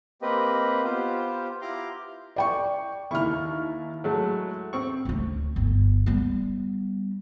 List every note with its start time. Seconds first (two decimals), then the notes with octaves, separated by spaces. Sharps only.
0.22 A#3 C4 G4 B4 D#5
0.84 B3 F4 G4 C5
1.62 E4 F4 G4 A#5 C6 D6
2.36 D5 G5 C#6
3.11 D#2 E4 C#6 F6
4.04 F#3 G#3 A3
4.73 C4 C#6
5.05 D2 D4
5.56 G1
6.06 G3 B3